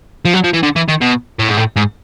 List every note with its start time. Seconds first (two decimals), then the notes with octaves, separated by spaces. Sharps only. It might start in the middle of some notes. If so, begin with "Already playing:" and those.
0.25 F3
0.34 F#3
0.44 F3
0.53 E3
0.63 D3
0.76 E3
0.88 D#3
1.01 B2
1.39 A2
1.49 G#2
1.57 A2
1.76 G#2